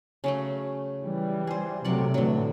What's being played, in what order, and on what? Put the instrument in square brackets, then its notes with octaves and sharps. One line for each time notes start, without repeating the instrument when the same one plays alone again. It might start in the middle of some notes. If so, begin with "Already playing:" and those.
[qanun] C#3 F#3 A3
[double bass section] E3 G3
[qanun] G#4 C5
[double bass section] C3 F#3 A3 [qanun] A#4 D5 F#5
[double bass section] A2 E3 [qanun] D3 F#3